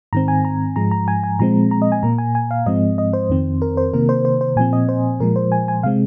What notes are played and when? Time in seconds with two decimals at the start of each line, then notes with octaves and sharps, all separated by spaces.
0.13 G#2 D#3 C4 A#5
0.28 G#5
0.45 A#5
0.76 G#2 F3 G#3 A#5
0.91 A#5
1.08 G#5
1.23 G#5
1.39 A#2 F3 G#3 C4 A#5
1.71 A#5
1.82 D#5
1.92 G#5
2.03 A#2 A#3 A#5
2.18 G#5
2.35 G#5
2.51 F5
2.66 G#2 F3 G#3 C4 D#5
2.98 D#5
3.13 C5
3.30 F2 D#3 C4
3.62 A#4
3.77 C5
3.93 C3 D#3 A#3 A#4
4.09 C5
4.25 C5
4.41 C5
4.56 A#2 F3 C4 G#5
4.73 D#5
4.89 C5
5.20 A#2 F3 G#3 A#4
5.36 C5
5.52 G#5
5.68 G#5
5.83 C3 G#3 C4 F5